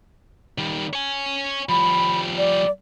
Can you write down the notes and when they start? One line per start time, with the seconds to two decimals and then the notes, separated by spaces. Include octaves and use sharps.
0.58 D#3 G3
0.93 C#5 G#5
1.69 F3 G3 B5
2.38 D5